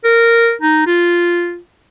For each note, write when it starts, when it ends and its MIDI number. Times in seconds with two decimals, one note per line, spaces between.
0.04 0.53 70
0.62 0.82 63
0.87 1.58 65